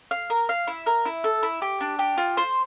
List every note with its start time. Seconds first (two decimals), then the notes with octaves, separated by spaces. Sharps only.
0.11 F5
0.30 A#4
0.49 F5
0.67 E4
0.86 A#4
1.05 E4
1.24 A4
1.43 E4
1.62 G4
1.81 D4
1.99 G4
2.18 F4
2.37 C5